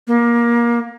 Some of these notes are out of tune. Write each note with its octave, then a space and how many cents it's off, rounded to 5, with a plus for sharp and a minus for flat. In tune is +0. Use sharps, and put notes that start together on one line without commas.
A#3 +25